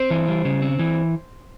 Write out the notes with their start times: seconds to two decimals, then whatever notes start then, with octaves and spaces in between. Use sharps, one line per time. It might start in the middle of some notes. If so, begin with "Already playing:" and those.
Already playing: C4 C5
0.10 E3
0.28 G3
0.45 C#3
0.62 C4
0.79 E3